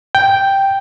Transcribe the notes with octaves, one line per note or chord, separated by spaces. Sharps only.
G5